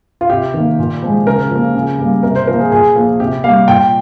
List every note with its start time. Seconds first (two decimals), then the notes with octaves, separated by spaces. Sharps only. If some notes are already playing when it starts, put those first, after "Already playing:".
0.21 F4
0.30 C3 G4
0.54 D#3 A#3
0.79 A#2
1.03 F3 G#3
1.27 C#3 A#4
1.50 F3 A#3
1.75 C#3
1.99 G3 A#3
2.23 C3 A#4
2.36 C5
2.47 F3 A#3 A#4
2.60 G#4
2.72 A#2 G#4
2.96 F3 A#3
3.20 C3 G4
3.44 G3 A#3 F5
3.68 A#2 G5